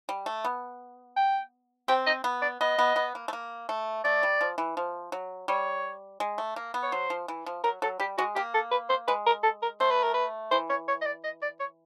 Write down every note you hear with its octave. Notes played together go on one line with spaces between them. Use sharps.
G3
A3
B3
G5
C4 G5
D#5
B3
D5
B3 D#5
B3
B3
A#3
A3
A#3
A3
A3 D5
G3
F3
E3
F3
F#3
G3 C#5
G#3
A3
A#3
B3
C#5
F#3 C5
F3
E3
F3
F#3 A#4
F#3 A4
G3 G4
G#3 F#4
A#3 G4
A4
B4
C5
G#3 B4
A#4
A4
A#4
A3 C5
B4
A#4
B4
E3 C5
C#5
C#5
D#5
D5
D#5
D5
C#5